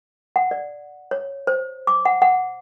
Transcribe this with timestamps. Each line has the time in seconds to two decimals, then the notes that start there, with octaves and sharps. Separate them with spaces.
0.36 F#5
0.51 D5
1.11 C#5
1.47 C5
1.87 D6
2.05 F#5
2.22 F#5